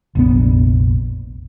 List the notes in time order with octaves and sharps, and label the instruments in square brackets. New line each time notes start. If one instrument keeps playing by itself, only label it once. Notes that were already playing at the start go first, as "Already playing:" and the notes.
[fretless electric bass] F1 A#1 B3